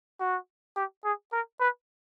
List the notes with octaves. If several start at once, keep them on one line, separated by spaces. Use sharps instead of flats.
F#4
G4
G#4
A#4
B4